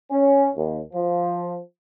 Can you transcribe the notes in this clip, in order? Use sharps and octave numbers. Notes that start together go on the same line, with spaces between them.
C#4
D#2
F3